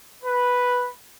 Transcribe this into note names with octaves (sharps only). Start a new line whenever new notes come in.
B4